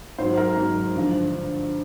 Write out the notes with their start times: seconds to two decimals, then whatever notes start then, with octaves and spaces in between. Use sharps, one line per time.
0.18 G#2 D#3 F#3 C5
0.37 A#4
0.57 G#2 D#3 F#3
0.95 G2 D3 F3